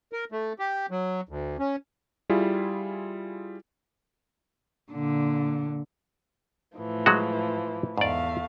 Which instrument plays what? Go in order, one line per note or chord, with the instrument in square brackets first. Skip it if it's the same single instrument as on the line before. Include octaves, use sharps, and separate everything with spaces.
[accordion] A#4
A3
G4
F#3
D2
C#4
[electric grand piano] G3 E4 F4 G#4
[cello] A#2 D3
[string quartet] A2 E3 F3
[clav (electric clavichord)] F#3 G#3 F#4
[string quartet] E2 A3 F5 [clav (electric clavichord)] G#2 D5